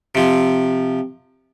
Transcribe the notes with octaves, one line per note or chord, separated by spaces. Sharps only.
C3 F3